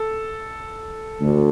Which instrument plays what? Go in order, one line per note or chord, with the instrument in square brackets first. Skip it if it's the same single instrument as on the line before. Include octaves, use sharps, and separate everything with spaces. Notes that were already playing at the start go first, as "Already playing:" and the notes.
Already playing: [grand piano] A4
[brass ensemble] D2